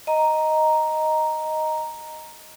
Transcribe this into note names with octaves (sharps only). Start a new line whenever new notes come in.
D#5 A#5